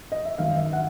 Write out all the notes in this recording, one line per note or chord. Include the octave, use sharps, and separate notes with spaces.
D#5
E5
G#1 F#2 D#3 F5
E5
F#5